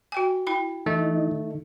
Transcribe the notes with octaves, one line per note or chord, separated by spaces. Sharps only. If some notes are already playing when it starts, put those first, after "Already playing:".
F#4 G5 G#5
E4 G5 B5
E3 A3 D#4
D#3